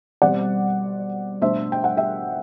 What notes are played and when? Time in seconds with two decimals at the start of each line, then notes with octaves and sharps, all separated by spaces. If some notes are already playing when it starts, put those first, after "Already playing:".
0.22 B2 G3 C4 D5 F#5
1.42 B2 A3 D4 C5 E5
1.72 G5
1.84 F#5
1.97 E5 G5